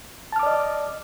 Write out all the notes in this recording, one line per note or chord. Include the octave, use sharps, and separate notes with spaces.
D5 D#5 A5 D6 F6